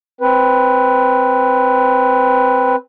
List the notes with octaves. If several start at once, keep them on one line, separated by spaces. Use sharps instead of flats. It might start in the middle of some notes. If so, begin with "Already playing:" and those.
C4 B4